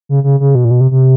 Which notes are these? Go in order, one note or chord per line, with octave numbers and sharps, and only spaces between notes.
C#3
C#3
C#3
B2
A#2
B2
C3
C3